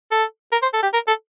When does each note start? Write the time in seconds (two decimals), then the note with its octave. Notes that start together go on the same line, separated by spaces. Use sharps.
0.11 A4
0.52 A#4
0.62 C5
0.74 A4
0.83 G4
0.93 A#4
1.08 A4